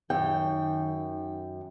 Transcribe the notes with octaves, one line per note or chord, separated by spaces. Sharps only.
F#2 D#3 G5